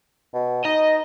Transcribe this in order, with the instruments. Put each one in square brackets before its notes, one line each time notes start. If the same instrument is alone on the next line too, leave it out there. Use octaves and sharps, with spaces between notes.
[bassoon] B2
[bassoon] D#4 [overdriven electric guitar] D#5